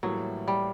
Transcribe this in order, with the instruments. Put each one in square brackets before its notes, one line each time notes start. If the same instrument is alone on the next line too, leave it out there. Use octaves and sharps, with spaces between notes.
[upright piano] A2 E3 G3 A#3 [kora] F#3
[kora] G3